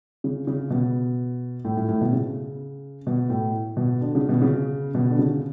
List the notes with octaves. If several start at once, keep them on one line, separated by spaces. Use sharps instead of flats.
C#3
C#3
B2
A2
A2
A2
B2
C#3
B2
A2
B2
D3
C#3
B2
C#3
B2
D3
C#3